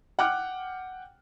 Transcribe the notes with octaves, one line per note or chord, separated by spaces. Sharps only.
F#5 G5 D6 F6 F#6